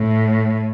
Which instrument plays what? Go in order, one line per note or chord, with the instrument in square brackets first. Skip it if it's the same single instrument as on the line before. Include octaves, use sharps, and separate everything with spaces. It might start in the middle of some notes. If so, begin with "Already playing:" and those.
Already playing: [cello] A2